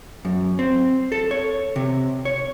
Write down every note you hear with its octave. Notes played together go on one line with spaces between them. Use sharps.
F#2
C4
A4
C#5
C3
C#5